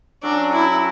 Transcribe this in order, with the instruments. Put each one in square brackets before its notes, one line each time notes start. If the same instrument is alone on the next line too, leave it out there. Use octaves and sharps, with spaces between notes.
[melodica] F#3 C#4 F#4 A4 [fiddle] D4
[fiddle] E4